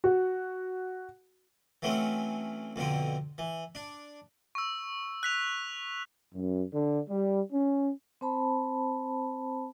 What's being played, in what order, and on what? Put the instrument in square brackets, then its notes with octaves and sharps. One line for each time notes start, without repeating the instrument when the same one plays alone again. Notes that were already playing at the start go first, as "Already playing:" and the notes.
[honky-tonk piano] F#4
[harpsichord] E3 F#3 A3 C4 C#4
F2 B2 D3 C4
E3
D4
[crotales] C#6 E6
F#6 B6 F7
[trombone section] F#2
D3
G3
C#4
[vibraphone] C4 C5 A5 B5